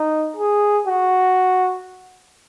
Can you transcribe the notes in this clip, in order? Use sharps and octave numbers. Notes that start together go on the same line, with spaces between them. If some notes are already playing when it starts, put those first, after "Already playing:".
Already playing: D#4
G#4
F#4